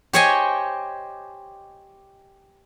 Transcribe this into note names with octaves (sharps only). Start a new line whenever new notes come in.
G4 C5 C#5 D#5 G5 G#5